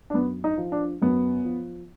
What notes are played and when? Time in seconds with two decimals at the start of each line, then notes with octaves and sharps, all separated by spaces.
0.10 D4
0.14 F#2 B3
0.44 D#4
0.57 F3
0.72 D4
1.02 F#2 B3
1.45 F3